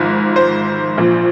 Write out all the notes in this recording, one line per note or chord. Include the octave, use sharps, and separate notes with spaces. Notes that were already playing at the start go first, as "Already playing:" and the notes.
Already playing: G#1 G#2 F3
C5
A#1 A#2 F3